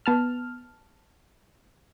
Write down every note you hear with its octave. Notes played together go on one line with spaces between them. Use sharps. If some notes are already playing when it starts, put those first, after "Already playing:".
B3 A5 F6